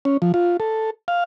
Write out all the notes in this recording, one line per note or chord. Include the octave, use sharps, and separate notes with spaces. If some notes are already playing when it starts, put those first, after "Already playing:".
C#4
F3
F4
A4
F5